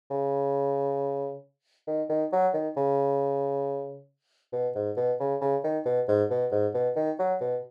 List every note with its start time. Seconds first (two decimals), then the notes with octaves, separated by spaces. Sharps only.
0.10 C#3
1.87 D#3
2.09 D#3
2.32 F#3
2.54 D#3
2.77 C#3
4.53 B2
4.75 G#2
4.97 B2
5.20 C#3
5.41 C#3
5.64 D#3
5.85 B2
6.08 G#2
6.30 B2
6.52 G#2
6.74 B2
6.96 D#3
7.19 F#3
7.41 B2